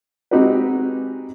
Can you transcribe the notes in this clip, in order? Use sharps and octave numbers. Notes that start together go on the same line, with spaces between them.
G#3 C4 D#4 F#4 G4 B4